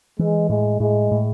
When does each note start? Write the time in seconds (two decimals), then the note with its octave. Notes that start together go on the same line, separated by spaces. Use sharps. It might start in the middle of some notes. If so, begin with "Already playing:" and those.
0.19 E3 G#3
0.49 A2 G#3
0.80 A2 G#3
1.11 A2